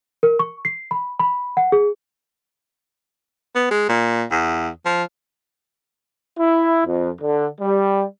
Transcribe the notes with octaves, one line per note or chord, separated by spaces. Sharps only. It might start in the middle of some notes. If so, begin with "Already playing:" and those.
A#4
C#6
C7
B5
B5
F#5
G#4
B3
G#3
A#2
E2
F3
E4
F2
D3
G3